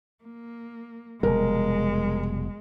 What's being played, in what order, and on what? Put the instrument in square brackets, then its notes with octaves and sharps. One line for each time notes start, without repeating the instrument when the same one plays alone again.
[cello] A#3
[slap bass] F1 B2 G3 [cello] G#3 [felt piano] A#4